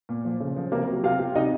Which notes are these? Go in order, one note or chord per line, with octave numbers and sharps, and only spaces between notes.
A#2
F3
C#3
F3
C3 A#3 A#4
F#3
C3 F4 F5
C3
C3 D#4 D#5